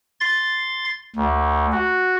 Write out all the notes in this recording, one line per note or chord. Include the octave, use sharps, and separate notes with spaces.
C6 A6
D2
F#4